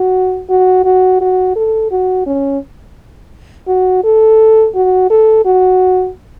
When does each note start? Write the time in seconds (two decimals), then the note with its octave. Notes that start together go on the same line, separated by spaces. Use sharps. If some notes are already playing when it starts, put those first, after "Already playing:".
Already playing: F#4
0.50 F#4
0.85 F#4
1.21 F#4
1.56 A4
1.91 F#4
2.27 C#4
3.68 F#4
4.04 A4
4.75 F#4
5.10 A4
5.45 F#4